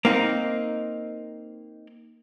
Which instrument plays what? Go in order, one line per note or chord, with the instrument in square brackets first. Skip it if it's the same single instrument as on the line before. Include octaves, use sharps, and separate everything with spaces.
[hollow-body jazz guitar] A#3 C4 D#4